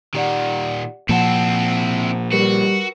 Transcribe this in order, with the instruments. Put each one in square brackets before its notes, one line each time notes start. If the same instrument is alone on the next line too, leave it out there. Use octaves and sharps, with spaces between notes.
[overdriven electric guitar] A#2 D#3 [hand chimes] G4 D5 F#5
[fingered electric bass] A#2 F3 [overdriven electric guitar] C4 E4 [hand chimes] F#5 A5 C#7
[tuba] G3 [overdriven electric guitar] F#4 [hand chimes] A#4 B4